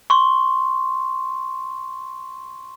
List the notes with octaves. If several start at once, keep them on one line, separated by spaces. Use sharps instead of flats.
C6 C#6